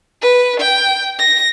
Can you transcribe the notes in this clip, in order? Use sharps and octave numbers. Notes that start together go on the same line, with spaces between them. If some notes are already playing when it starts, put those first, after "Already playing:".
B4
G5
A#6